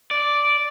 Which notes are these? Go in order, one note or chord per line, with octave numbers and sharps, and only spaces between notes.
D5